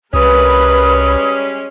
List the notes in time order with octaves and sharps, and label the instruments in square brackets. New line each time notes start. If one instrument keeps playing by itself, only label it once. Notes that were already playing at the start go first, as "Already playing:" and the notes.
[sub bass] C2 [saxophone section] G3 G#3 C#4 [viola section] A#4 B4 [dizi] D#6